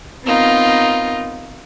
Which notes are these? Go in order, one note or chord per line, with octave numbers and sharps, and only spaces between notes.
B3 C4 D#4 F4 A#4